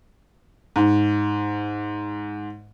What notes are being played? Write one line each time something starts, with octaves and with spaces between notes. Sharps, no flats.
G#2